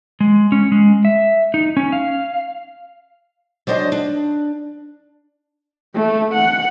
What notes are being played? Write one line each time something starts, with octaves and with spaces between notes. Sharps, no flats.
G#3
C#4
G#3
E5
D#4
C#4
F5
F#3 D4 C5 D#5 A5
D4
A3
F#5